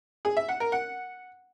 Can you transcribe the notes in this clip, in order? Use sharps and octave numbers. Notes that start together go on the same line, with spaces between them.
G#4
E5
F#5
A#4
F#5